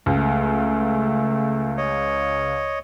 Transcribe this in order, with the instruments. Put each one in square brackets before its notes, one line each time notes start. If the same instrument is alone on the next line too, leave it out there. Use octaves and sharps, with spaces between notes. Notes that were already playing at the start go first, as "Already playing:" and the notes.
[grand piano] C#2 [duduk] A3
[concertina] C#5 D#5